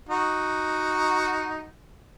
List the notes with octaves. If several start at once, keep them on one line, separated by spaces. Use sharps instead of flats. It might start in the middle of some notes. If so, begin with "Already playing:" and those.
D#4 F#4